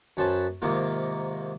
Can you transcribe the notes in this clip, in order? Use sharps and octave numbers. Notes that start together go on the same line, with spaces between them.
F#2 C#4 B4 C5 A5 B5
G#2 C3 D#3 A#3 F4